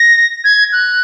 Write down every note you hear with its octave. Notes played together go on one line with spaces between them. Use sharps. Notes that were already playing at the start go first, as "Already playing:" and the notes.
Already playing: A#6
G#6
F#6